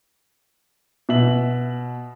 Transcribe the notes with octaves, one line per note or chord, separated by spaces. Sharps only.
B2 E5 F#7